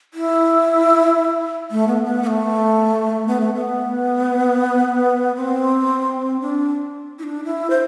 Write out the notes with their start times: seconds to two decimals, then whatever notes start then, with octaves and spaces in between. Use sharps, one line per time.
0.14 E4
1.71 A3
1.88 B3
2.05 B3
2.23 B3
2.27 A3
3.27 B3
3.41 A3
3.54 B3
5.35 C4
6.40 D4
7.19 E4
7.23 D4
7.45 E4
7.70 C5